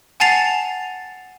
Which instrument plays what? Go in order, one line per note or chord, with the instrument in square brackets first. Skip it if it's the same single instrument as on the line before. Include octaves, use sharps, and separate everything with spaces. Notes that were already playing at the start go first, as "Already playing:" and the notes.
[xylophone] F#5 G#5 A5 A6 C7 F7